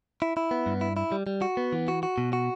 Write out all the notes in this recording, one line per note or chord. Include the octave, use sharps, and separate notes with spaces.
E4
E4
B3
G2
E4
E4
G3
G3
F#4
B3
E3
F#4
F#4
B2
F#4